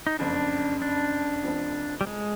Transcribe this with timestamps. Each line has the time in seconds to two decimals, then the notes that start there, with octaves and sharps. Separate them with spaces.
0.07 D#4
0.19 F#1 F2 C#3 D4
0.82 D4
1.43 F1 F2 C3 F3
2.01 G3
2.07 G#3